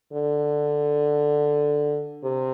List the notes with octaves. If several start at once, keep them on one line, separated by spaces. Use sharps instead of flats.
D3
C3